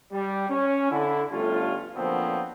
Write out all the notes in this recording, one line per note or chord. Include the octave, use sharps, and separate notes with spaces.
G3
C#4
D3 E4
G1 G3 A3 C#4 F4
A#2 D3 F3 F#3 B3 C4